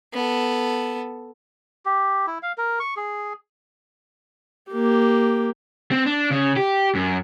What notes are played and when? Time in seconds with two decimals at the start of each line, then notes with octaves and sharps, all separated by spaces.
0.13 B3 A4
1.86 G4
2.27 E4
2.43 F5
2.58 A#4
2.80 C#6
2.97 G#4
4.72 A#3 G4
5.92 C4
6.06 D4
6.31 C#3
6.57 G4
6.95 F#2